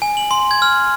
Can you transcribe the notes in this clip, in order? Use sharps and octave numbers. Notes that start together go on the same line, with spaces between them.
G#5
F#7
C6
G#6
F6